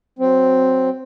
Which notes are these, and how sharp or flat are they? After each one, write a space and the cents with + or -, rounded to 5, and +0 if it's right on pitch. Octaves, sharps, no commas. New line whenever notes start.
F#3 +0 C4 +0